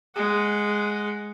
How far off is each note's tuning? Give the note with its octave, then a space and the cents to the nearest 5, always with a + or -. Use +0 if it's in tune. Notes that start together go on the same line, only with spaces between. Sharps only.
G#3 +0 F#5 +0